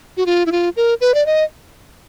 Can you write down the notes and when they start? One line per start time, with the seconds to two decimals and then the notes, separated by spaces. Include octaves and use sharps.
0.17 F#4
0.26 F4
0.46 E4
0.52 F4
0.77 A#4
1.01 B4
1.14 D5
1.26 D#5